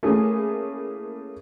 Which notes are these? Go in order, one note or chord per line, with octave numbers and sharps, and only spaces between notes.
A3 A#3 C#4 E4 G#4